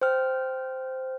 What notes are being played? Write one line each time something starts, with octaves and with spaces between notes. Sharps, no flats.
C5 G5 F6